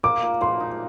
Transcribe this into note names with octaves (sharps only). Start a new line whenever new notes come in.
A#3 D6
A#2
A#2 C6
D#4